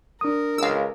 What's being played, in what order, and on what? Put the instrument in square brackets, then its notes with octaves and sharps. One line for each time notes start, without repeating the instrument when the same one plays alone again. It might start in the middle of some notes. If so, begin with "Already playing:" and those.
[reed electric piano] D4 D#6 [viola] A#4
[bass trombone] C#2 [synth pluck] F5 E6